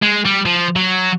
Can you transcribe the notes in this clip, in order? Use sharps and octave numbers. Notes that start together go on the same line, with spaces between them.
G#3
G3
F3
F#3